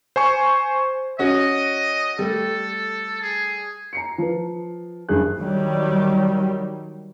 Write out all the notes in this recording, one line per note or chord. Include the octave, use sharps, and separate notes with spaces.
C5 G#5 C#6
C#4 F#4 D#5
G3 A3 A4
G#4
A#5 C7 C#7
F3 B4
F#1 G2 G#4 F#6
D#3 F#3 G3